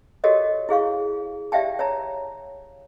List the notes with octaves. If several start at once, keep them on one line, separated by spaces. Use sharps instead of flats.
F#4 G4 A4 A#4 C#5 D#5
E4 G#4 F5 C#6
G4 D5 E5 F5 G5 A5
C#5 A5 A#5